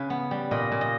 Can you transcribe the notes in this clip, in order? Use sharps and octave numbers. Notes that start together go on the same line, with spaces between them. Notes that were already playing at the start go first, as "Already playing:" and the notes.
Already playing: C#3 B4
B3
G3
A#2 D#5
A#2
D#5